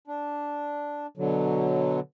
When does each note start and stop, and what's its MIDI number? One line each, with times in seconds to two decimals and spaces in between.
0.08 1.07 62
1.17 2.00 47
1.17 2.00 50
1.17 2.00 54